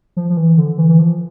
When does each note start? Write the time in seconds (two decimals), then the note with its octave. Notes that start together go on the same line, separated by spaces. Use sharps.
0.16 F3
0.30 F3
0.37 E3
0.58 D3
0.78 E3
0.89 E3
0.99 F3